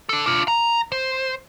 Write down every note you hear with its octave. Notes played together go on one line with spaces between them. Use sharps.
D4 A4
D4 F4
A#5
C5